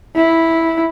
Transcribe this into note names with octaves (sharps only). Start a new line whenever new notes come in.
E4